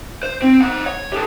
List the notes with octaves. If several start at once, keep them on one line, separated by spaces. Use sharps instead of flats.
C5
C4
C5 F#5
C#5
G4 A4